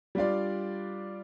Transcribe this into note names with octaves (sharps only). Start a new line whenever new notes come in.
G3 D4 F4 D5